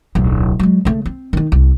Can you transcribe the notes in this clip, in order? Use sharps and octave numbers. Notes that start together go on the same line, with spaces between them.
D1 B1
F#3 G#3
C#3 A3
C4
D#3 D#4
C2